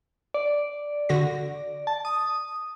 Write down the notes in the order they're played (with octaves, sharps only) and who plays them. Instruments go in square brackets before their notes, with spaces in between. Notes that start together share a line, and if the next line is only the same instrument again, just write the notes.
[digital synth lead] D5
[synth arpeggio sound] D3 F#4 A#6
[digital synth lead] A5
D#6